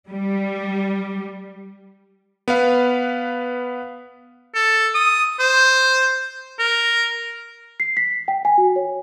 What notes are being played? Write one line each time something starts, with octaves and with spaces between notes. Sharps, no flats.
G3
B3 B4 F5
A4
D#6
C5
A#4
C7
B6
G5
G#5
F#4
C#5